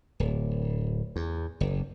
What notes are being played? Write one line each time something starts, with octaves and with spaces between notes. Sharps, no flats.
D1
E2
F#1